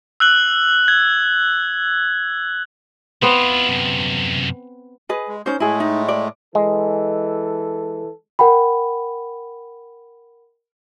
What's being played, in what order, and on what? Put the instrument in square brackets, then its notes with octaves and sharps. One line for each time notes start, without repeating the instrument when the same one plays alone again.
[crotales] E6 F#6 F#7
G#6
[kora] B3 C4 [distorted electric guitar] E4 F4
[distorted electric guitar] F#2 C3
[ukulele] G#4 B4 D#5
[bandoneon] G#3
[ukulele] C#4 D#4 C5 [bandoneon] G6
[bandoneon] A2 G#3 A3 [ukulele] E4 G#4
[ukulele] D#4
D5
[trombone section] E3 A4 [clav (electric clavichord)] G#3
[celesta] A#4 F#5 G5 B5